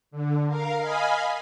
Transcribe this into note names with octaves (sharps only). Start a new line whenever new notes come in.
D3
A#4 F5
D#5 F5 G#5 B5